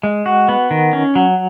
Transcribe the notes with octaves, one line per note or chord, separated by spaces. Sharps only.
G#3
F#4
B3
D#3
C#4
F#3